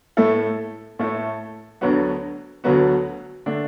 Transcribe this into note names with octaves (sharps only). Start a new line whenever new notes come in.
A2 A3 E4 A4
A2 A3 E4 A4
D2 D3 F#3 B3 F#4
D2 D3 F#3 B3 F#4
D3 A3 D4